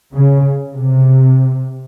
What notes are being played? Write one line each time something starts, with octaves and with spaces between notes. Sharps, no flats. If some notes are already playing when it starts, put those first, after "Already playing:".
C#3
C3